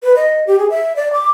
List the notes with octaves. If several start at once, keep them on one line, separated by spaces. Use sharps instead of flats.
B4
D#5
G4
G#4
E5
D5
D6